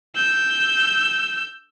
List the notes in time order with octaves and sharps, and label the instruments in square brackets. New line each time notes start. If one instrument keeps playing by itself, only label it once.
[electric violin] E6 G6